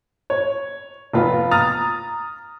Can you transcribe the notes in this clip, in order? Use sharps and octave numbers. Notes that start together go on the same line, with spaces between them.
C#5
F1 B3 F4
A#5 D#6 F6 A6